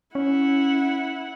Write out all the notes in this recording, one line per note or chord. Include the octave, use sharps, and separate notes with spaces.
C#4 E4 F#5